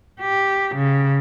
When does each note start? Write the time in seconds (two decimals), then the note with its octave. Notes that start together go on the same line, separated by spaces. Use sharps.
0.20 G4
0.75 C#3